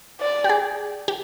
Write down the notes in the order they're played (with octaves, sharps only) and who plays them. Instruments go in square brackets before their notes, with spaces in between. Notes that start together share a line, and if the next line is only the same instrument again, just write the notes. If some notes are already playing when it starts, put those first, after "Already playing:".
[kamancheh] D5
[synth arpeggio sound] G4
G#4
G4